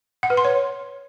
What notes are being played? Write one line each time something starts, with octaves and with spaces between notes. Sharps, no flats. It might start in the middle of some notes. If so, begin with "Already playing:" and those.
F#5
B4
C6
C#5